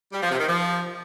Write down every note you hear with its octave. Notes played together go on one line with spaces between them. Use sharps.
G3
F3
C3
D#3
F3